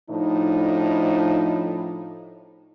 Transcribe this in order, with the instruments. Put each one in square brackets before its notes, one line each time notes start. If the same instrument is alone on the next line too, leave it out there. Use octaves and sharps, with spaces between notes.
[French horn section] A2 F3 D4 D#4